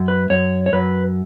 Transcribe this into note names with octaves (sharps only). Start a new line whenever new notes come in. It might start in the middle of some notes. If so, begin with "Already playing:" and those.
Already playing: F#2
B4
F#2 C#5
C#5
F#2 B4